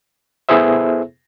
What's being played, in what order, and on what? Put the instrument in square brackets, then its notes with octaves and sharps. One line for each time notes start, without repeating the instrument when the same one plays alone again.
[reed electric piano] B3 E4 G#4 A4 C5 E5